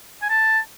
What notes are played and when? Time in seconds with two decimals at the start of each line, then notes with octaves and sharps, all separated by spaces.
0.22 G#5
0.30 A5